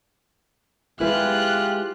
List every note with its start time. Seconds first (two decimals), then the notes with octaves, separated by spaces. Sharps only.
1.00 G#3 E4 F4 G4 B4 F#6